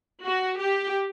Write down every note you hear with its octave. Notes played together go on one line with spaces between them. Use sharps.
F#4
G4